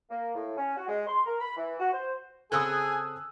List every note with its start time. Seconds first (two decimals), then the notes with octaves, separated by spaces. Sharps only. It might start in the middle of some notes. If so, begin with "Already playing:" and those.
0.10 A#3
0.35 A2
0.57 C#4
0.77 F#4
0.88 G#3
1.06 C6
1.25 A#4
1.40 B5
1.56 E3
1.79 F#4
1.92 C5
2.52 C#3 C4 G#4 A4 G#5 D#6 E6 F#6